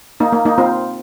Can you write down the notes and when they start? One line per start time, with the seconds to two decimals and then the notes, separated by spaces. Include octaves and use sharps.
0.20 A#3 D#4
0.32 A#3
0.45 A#3 D#4
0.58 C4 F4